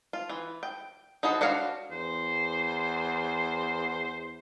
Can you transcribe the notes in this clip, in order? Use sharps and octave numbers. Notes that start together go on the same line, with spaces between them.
F4
E3
G5
D#4 E4 F#4 A4 C5
D4 F#4 C#5 F5
E2 C5